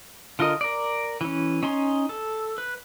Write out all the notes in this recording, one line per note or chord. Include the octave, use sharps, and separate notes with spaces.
D3 F4 A#4 D#5
A#4 D5
E3 C#4
C#4 D#4 G#5 C6
A4
B4